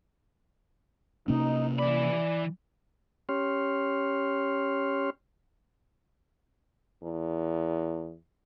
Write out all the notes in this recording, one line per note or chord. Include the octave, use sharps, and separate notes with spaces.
C3 A#3 C#4 D#4
E3 D5 B5
C#4 G4 C#5 C6 F6
E2